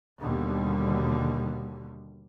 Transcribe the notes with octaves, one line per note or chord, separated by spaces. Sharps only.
D#2 B2 D3 G3